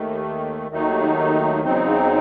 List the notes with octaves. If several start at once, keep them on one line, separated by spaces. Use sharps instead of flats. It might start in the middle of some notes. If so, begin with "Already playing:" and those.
Already playing: D#2 D#3 A3
D#2 D#3 F#3 A3 D#4
E2 C#3 F#3 C4 D#4